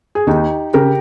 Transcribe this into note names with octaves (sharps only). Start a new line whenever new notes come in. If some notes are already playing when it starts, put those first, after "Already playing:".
G#4
D#2 D#4 G4
C#3 G4 A#4